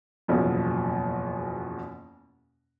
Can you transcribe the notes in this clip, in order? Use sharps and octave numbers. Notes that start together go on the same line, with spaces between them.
F#1 E2 B2 F3